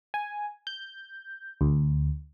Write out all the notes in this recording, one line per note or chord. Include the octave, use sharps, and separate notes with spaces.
G#5
G6
D2